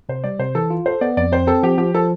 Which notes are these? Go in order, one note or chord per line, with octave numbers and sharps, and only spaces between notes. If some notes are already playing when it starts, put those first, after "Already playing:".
C3 C5
G3 D5
C3 C5
E3 A4
F4
A4 C5
B3 D5
F2 D5
C4 C5
C4 A4
F3 G4
F3 G4
F3 A4